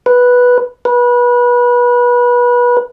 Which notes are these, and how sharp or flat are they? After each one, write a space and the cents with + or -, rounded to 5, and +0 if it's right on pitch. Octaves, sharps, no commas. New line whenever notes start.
B4 -5
B4 -25